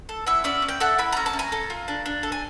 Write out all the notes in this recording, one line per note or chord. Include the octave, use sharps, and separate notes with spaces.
A4
E4 E5 F#5
C#4 D5 E5
C#4
G5
A4 E5 F#5
E4 B5
C#4 A#5
A5
C#4
G#5 A#5
A4
F4
D4
D4
A4
G#5